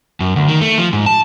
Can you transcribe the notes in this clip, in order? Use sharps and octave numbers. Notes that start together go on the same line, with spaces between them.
F#2
D2
D#3
A3
F3
G#2
A5